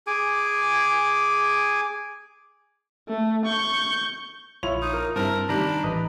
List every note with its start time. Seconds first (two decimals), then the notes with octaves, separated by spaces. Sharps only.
0.07 G#4 G#5 D6
3.08 A3
3.45 C#6 G6
4.63 A#1 E4 F4 C#5 F7
4.82 D#4
4.94 A#4
5.16 G2 C4 E4 A#4 A5
5.49 D#3 G3 D4 A#5 B5
5.84 A1 B4 D#5 A#5